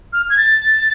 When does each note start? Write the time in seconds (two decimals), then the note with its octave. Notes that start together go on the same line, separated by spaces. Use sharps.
0.13 F6
0.30 G#6
0.37 A6